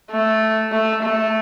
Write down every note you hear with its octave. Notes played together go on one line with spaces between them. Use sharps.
A3
A3
A3